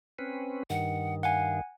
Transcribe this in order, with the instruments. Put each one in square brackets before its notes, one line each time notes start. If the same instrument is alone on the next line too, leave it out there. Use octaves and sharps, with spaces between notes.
[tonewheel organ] C4 C#4 B4
[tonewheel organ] G2 D#3 [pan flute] F#5
[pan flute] F5 [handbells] F#5 G#5